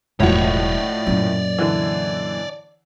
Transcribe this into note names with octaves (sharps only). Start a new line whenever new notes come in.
E1 A2 F3 F#3 F#4 C#5 D5
F#2 A#2
D3 E3